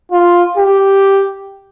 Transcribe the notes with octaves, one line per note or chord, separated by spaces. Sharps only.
F4
G4